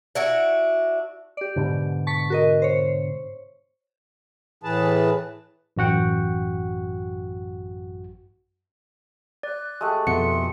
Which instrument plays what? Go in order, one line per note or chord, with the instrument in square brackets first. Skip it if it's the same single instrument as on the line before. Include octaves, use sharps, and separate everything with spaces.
[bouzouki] D4 E4 F#4
[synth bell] G4 D5
[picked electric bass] G#2 B2 D3
[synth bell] A5 C#6 B6
F#4 A#4 D#5
C5 C#5
[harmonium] A2 E3 G#4 B4 A5
[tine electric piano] A1 F#2 F#4 F#5 G5
[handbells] D5 [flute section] F#6
[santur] G#3 A3 G4
[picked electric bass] F2 B2 [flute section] A4 E5 C6 [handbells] F#5 C#7